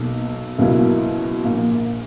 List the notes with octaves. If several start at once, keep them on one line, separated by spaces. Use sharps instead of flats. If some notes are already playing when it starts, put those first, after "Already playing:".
Already playing: B1 B2 A#3 D#4
C#2 B2 F#3 A#3 E4
A#1 A#2 A#3